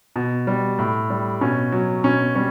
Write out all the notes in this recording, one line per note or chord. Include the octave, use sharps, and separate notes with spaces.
B2
G3
A2
G3
B2 C#4
F#3
B2 C#4
G3 C#4